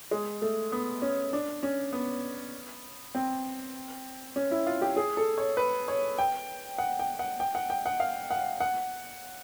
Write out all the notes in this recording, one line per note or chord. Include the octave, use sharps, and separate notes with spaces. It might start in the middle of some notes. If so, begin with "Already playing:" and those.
G#3
A3
B3
C#4
D4
C#4
B3
C4
C#4
E4
F4
G4
G#4
A4
C#5
B4
C#5
G5
F#5
G5
F#5
G5
F#5
G5
F#5
F5
F#5
F#5